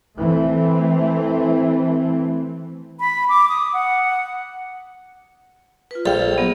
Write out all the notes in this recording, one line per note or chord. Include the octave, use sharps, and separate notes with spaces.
E3 A3 C4
B5
D6
D#6
F#5
F4 B4
A#1 A4 F5 G5
F#3 B3